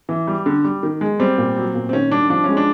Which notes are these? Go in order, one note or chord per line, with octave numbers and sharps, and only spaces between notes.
E3
G3
D3
G3
D#3
G#3
G3 C4
A#2
F#3
A#2
C4
D#3 C#4
G3 D4
F3 D4
G#3 C#4
D4